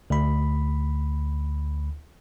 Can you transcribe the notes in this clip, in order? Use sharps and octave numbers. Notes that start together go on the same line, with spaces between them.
D2 B5